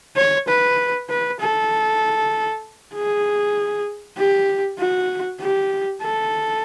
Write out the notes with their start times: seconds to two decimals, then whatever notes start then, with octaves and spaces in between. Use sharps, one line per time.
0.16 C#5
0.48 B4
1.09 B4
1.40 A4
2.94 G#4
4.17 G4
4.79 F#4
5.40 G4
6.02 A4